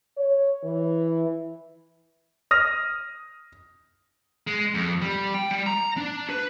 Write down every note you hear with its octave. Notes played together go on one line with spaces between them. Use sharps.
C#5
E3
D#6 F6 A#6
G#3
F2
G3
G5
G3
A#5
D4
B4